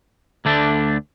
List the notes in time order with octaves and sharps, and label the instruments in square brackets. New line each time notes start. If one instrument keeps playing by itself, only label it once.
[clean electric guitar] D2 D3 A3 D4